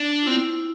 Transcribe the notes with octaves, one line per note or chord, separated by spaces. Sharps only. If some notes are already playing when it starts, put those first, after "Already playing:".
Already playing: D4
F4
C4 E4